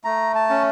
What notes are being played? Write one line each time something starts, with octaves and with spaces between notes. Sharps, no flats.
A3 A#5
A5
C#4